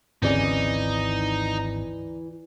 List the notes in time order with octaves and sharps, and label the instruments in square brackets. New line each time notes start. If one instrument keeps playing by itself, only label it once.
[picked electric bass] G#1 C4 [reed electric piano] D2 D5 [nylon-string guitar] E3 C#4 G#4 [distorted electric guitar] D#4